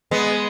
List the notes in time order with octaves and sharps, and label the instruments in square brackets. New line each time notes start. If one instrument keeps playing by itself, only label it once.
[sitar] G#3 B3